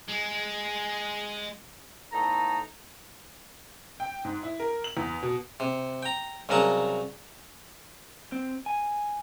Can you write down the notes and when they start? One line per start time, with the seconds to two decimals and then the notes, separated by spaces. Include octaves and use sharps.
0.08 G#3
2.13 A2 B3 D#4 A4 A#5
4.00 G5
4.25 G#2
4.43 E4
4.60 A#4
4.84 F#7
4.97 E2
5.23 B2
5.60 C3
6.03 G5 A#5
6.49 C2 C#3 F#3 A#4 A5 A#5
8.32 C4
8.66 G#5